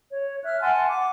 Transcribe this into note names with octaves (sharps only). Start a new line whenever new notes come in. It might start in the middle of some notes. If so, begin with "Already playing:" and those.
C#5
E5 F6 F#6
F#5 G#5 A5 C6
F#5 D6